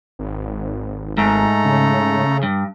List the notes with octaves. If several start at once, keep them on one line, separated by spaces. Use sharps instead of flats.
G#1
G#2 A3 A4 A#5
C#3
G2